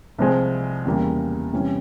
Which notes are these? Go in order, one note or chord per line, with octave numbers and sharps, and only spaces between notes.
C2 C3 F3 G#3 C4
E2 C#3 G3 A#3
C3 E3 G3 C#4